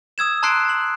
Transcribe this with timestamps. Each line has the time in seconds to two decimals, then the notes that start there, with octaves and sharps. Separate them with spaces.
0.18 D#6 E6 G#6 E7
0.43 A5 A#5 C6 F#6 C7 D7
0.69 F#7